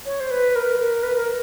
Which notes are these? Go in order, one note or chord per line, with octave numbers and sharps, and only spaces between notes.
C#5
C5
B4
A#4
A#4
B4
A#4